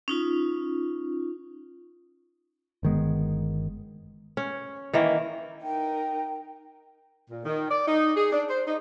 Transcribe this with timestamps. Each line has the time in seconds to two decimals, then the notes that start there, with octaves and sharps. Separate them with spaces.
0.08 C#4 D#4 F4
2.83 G1 D#3 G#3 B3
4.37 C#4
4.93 D#3 E3 A#3
5.63 D#4 A#4 G5
7.28 A#2
7.45 D#3
7.70 D5
7.86 D#4
8.16 G#4
8.32 D4
8.48 C5
8.67 D#4